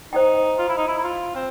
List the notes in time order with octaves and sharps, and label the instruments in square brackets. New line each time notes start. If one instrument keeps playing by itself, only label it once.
[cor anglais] D#4 [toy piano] C5 D#5 G5
[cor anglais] F4
E4
D#4
E4
E4
F4
C4